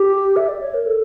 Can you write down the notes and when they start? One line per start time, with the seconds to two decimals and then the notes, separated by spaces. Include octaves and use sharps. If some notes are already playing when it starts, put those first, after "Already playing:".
Already playing: G4
0.36 E5
0.48 D5
0.61 C#5
0.74 A#4
0.86 A4